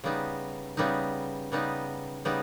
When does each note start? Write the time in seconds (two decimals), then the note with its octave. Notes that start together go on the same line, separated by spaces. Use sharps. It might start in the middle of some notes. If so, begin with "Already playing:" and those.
0.04 C#3 G3 B3 D#4
0.77 C#3 G3 B3 D#4
1.52 C#3 G3 B3 D#4
2.25 C#3 G3 B3 D#4